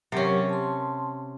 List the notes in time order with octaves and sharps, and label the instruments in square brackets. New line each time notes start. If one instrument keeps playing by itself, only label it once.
[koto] C3 C#4 [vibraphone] F#3 G4 A#4
[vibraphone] A5 C6